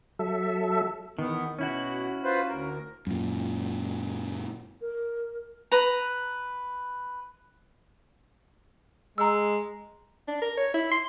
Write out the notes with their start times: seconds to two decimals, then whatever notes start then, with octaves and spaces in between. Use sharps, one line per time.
0.19 F#3 A4 E5
1.19 E2 D#3 B3
1.59 B2 C#4 E4 F#4
2.24 F4 B4 C5
2.48 D2 A#4
3.07 F#2 A#2
4.81 A#4
5.72 B4 A#5
9.18 G#3 A#5 E6
10.28 D4
10.41 A#4
10.57 C#5
10.74 E4
10.91 C6